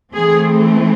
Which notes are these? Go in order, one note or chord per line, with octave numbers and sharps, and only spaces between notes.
E3 A3 C4 G#4